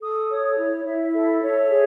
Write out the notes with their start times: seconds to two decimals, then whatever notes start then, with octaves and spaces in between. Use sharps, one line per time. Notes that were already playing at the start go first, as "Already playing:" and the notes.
0.01 A4 D#6
0.30 C#5
0.57 E4
0.85 E4 E5
1.13 A4
1.41 C#5
1.69 G#4